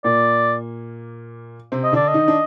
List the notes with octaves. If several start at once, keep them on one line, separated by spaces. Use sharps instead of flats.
A#2 A#3 D5
C3 C4
D#5
D3 D4 D5
D#5
D#3 D#4
D4